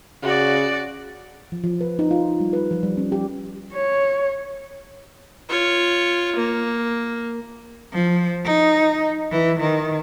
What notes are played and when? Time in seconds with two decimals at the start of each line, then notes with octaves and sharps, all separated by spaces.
0.23 C#3 F#4 D5
1.52 F3
1.64 F3
1.81 B4
1.99 D#4
2.11 F4
2.40 G3
2.53 B4
2.71 F3
2.83 G3
2.97 C#4
3.12 G4
3.73 C#5
5.49 F4 C#5
6.35 A#3
7.93 F3
8.44 D#4
9.31 E3
9.60 D#3